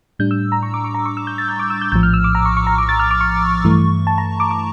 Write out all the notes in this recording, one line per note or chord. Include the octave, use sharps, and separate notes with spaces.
A2 G3 D4 G6
E6
A#5
C#6
D6
C#6
A#5
C#6
E6
G6
A6
G6
D6
E6
G6
A#1 A2 F3 G6
F6
E6
D6
A#5
C#6
C#6
A#5
D6
A6
F6
D6
C#6
G2 E3 A3
A5
A#5
D6
D6